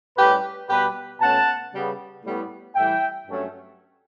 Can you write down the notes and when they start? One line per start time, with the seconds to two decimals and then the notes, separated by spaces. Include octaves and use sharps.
0.17 A2 G3 C#4 G4 B4
0.68 B2 G3 B3 G4 B4
1.20 B2 A3 C#4 F#5 A5
1.73 C#3 G3 B3
2.24 A2 G3 B3
2.75 A2 E3 G3 E5 G5
3.27 G2 F#3 A3 C#4